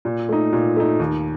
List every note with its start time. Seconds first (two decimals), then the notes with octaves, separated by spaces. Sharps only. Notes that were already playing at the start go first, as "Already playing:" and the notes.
0.05 A#2
0.29 A3 D#4
0.53 A#2
0.76 A3 D#4
1.00 D#2